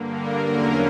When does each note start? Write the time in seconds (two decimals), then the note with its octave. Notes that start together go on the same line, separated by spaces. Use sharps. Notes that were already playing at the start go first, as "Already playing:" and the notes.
Already playing: G2 D3 A#3
0.13 A#4
0.45 E2 D3 F#3 A#3 C#4 A#4